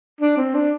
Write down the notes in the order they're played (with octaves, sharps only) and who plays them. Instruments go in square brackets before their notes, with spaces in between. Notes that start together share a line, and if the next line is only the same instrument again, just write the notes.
[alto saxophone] D4
C4
D4